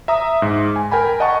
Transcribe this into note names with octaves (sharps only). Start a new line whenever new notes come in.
E5 A#5 D#6
G#2
G#5
A#4 G5 G#5 B5
D#5 F#5 A5 C#6